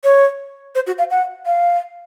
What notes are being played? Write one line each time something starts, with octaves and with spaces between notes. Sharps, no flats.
C#5
C5
F#4
F5
F#5
F5